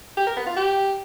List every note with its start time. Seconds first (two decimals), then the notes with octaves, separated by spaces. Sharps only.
0.17 G4
0.27 A#4
0.37 B3
0.46 F4
0.56 G4